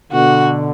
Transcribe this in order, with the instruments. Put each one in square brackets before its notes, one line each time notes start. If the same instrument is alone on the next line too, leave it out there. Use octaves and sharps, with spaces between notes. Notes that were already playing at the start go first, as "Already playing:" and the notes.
[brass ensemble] B2 D3 [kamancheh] F#4